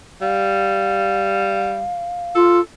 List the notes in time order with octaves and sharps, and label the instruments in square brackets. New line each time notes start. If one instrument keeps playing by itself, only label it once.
[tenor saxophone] G3 [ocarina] F5
[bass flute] F4 [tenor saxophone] A4